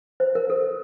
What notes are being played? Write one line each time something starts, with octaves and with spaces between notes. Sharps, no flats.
C5
A#4
A4